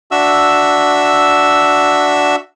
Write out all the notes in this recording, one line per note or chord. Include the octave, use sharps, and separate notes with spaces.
D4 F#4 E5 E6